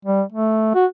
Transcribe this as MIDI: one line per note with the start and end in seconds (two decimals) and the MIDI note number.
0.05 0.22 55
0.32 0.69 57
0.75 0.86 66